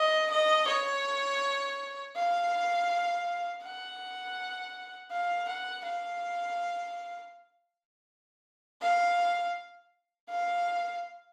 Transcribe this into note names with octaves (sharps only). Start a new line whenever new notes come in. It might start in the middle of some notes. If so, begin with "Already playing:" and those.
Already playing: D#5
D#5
C#5
F5
F#5
F5
F#5
F5
F5
F5